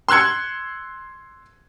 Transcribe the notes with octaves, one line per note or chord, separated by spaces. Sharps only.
C6 E6 F#6 G#6 C#7